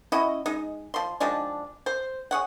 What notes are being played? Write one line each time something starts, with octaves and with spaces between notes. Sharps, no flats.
C#4 E4 F#4 D#5
G#3 D#4
F3 C6
D#3 F3 G#3 D4
C5
G#4 C#5 F#5